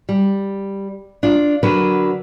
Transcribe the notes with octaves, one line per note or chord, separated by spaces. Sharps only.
G3
D4 F4
D3 F#3 D4 A#4 B4